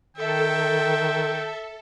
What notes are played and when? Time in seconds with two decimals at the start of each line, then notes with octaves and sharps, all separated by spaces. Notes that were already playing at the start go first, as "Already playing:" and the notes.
0.17 D#3 A4 E5 G5